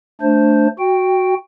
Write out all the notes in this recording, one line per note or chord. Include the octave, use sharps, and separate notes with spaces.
A3 D4 C5
F#4 G5